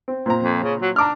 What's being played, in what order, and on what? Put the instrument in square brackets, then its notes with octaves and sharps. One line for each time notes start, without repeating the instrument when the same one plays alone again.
[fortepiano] C4
A#2 C4 A#5
[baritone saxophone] F2
C#3
F#3
[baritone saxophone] D4 [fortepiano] A#5 D6 F6